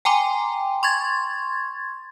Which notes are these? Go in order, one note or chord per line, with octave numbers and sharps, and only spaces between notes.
G5 G#5 A#5 C6 D6
C6 C#6 G#6 A6